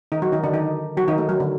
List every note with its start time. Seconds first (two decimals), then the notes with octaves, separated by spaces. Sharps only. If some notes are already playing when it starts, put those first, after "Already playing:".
0.12 D#3 D#4
0.22 F#3 F#4
0.32 D#3 D#4
0.44 D3 D4
0.54 D#3 D#4
0.97 F#3 F#4
1.08 D#3 D#4
1.18 A3
1.29 F#3
1.40 D3